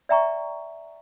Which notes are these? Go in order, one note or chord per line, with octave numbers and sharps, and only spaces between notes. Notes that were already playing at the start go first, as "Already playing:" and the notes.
D5 E5 G5 A#5 C#6